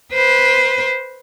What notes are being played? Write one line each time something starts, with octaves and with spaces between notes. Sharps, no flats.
B4 C5